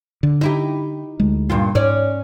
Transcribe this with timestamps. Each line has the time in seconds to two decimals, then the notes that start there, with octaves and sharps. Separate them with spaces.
0.23 D3
0.41 D#4 E4 G4
1.20 D2 G#3
1.50 G2 A#2 F4
1.75 G#2 C#4 D5